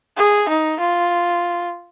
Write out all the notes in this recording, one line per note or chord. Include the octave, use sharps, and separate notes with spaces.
G#4
D#4
F4